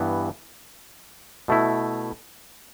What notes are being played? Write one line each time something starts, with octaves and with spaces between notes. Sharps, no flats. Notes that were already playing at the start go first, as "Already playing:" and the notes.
Already playing: G2 E3 B3
B2 A3 E4